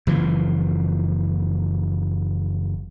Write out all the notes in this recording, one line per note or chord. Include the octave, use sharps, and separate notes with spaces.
F#1 E3 F3